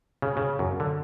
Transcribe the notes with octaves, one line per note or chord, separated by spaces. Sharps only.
C#3
C#3
F#2
D3